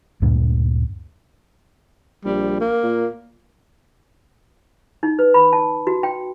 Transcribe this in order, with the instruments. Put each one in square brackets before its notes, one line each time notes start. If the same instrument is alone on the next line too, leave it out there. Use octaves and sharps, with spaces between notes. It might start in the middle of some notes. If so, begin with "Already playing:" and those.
[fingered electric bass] D2 G2 A#2 D3
[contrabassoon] A#1 [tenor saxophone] G3
[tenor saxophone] A#3
[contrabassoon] A#2
[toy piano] D#4
B4
B5
A5
F#4
G5